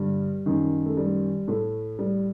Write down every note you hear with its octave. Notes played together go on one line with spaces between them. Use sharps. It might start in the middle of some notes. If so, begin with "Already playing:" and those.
Already playing: G2 D3 G3
F#2 D#3
A3
G3
A2 A3
G3